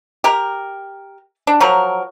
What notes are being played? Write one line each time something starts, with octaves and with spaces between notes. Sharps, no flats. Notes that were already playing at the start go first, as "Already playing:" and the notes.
G4 A#4
D4
F3 F#3 A#4